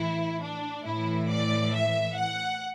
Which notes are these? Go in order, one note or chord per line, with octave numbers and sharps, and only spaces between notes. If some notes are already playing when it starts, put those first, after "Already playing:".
Already playing: A2 E3 E4
D4
A2 E3 E4
D5
E5
F#5